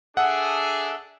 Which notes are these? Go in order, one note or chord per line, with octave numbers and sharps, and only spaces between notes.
D4 G#4 A4 E5 F#5